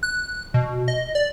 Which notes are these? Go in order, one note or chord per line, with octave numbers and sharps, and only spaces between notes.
F#6
B2
D#5
D5